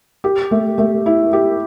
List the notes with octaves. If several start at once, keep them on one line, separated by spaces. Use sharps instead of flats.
G4
A3
A3
E4
G4